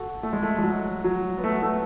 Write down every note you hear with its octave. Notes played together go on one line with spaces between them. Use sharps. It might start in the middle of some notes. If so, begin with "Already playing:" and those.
Already playing: F#4 A4
A3
G#3
A3
G#3
F#3
F#3
B3
A3
A3